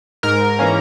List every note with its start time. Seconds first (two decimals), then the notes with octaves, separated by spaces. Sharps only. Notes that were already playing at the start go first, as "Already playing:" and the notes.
0.23 G#2 A#4
0.59 E3 A#3 C#4